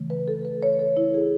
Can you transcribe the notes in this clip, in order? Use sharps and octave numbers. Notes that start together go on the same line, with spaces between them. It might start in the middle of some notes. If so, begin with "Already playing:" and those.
Already playing: C#3 E3 A3
B4
A4
B4
C#5
A4
E4
G#4